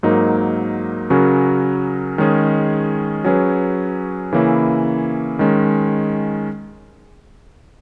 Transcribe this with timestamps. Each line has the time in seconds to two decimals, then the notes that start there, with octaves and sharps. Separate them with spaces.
0.03 G#2 F#3 A#3 D#4 A#4
1.10 C#3 F#3 C#4 F#4 A#4
2.18 D#3 G#3 C#4 G#4
3.24 F#3 C#4 G#4 B4
4.33 C#3 E3 A#3 C#4 E4
5.39 D#3 G#3 C#4